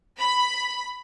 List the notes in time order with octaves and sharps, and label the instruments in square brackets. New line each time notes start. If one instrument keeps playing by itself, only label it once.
[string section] B5